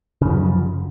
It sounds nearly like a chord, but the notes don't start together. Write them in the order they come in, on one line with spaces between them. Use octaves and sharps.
C#3 F#2 F3